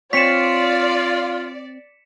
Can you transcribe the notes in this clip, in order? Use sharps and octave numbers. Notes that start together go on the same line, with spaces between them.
C4 F4 C#5 D5 B6 C#7 E7